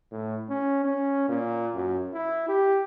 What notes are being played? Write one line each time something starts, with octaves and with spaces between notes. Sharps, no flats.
A2
C#4
C#4
A#2
F#2
E4
G4